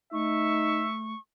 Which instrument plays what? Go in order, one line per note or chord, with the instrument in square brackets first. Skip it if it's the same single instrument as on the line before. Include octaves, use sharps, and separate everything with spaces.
[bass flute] A3 [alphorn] D#4 [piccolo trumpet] E5 [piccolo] C#6